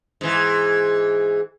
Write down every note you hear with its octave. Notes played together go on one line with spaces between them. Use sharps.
G#2 E3